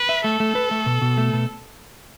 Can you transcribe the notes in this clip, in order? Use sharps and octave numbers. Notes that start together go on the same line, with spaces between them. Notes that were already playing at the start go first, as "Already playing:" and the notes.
Already playing: B4
E5
A3 A4
A3
B4
A3
B2
B2
A3
B2